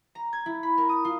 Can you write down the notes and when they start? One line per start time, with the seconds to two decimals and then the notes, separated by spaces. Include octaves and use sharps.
0.15 A#5
0.33 G#6
0.46 E4
0.63 B5
0.78 A#4
0.89 D#6
1.05 F4